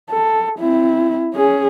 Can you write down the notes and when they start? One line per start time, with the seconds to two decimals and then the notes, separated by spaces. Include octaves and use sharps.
0.10 A4
0.59 C4 E4
1.34 C#4 G#4